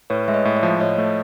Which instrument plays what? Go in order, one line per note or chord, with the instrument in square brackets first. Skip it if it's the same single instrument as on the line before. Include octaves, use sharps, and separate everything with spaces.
[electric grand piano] A2 [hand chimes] B4 C#5
[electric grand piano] G#3 [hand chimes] E5
[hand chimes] C#5 D#5
[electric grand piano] A2
[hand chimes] D5 E5
[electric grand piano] F3
[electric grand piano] A2 [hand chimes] C#5 D#5
[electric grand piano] A3